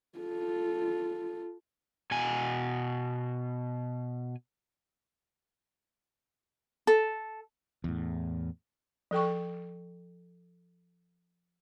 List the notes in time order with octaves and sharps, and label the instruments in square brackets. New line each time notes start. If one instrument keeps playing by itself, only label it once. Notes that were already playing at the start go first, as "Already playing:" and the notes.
[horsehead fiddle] F4 A4
[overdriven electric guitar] B2 G#5
[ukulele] A4
[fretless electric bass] E2 A2
[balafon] F3 A4 G5 C#6